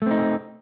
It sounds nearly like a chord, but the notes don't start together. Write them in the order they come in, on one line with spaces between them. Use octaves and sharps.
A3 C4 D#4